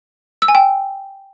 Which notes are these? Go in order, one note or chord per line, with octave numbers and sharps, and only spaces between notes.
E6
G#5
G5